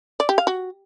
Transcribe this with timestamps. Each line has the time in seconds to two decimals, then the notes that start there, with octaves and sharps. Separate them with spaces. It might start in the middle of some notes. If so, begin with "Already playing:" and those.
0.20 D5
0.29 G4
0.38 F5
0.47 F#4